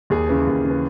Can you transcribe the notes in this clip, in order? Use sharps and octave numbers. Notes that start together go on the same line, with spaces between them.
D#2 G#4
C#3 E3
D#2
C#3 E3